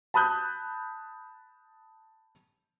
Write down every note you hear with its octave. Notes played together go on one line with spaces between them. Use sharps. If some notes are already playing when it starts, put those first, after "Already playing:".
A5 B5 D#6 F#6 G6